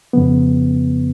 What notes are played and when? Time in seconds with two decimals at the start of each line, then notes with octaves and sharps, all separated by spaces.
0.13 F2 C#3 F3 B3